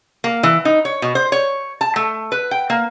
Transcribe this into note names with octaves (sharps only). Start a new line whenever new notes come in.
A#3
E3
D#4
C#5
B2
C5
C#5
A5
A3
B4
G5
A#3